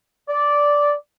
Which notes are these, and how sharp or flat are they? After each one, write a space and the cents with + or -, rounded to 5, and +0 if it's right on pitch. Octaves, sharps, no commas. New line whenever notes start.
D5 -10